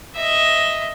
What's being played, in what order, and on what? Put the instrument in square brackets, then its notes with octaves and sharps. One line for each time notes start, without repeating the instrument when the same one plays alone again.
[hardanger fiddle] D#5 E5